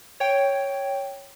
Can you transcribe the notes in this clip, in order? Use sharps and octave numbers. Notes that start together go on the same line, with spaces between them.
C#5 G5